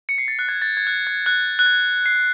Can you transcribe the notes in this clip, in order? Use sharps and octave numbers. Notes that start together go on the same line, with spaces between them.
C#7
C7
A6
F#6
G#6
A6
G#6
F#6
G#6
F#6
F#6
G#6
C7